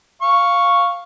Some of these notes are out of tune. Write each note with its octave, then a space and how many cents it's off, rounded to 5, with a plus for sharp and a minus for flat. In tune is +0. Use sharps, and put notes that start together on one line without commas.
F5 +0 C#6 +0